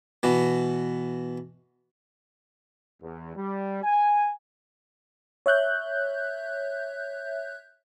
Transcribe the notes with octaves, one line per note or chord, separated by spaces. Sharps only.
B2 E3 F#4
E2
G3
G#5
C#5 E5 F#6 G6